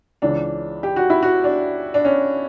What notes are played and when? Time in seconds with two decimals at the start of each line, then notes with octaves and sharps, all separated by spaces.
0.22 C#2 C#3 E3 D4
0.83 G4
0.96 F#4
1.10 E4
1.23 F#4
1.44 D4
1.94 D4
2.05 C#4